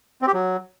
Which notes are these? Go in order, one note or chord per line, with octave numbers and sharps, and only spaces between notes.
C4
G4
F#3